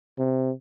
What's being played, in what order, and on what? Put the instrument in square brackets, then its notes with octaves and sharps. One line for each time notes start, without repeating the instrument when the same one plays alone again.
[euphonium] C3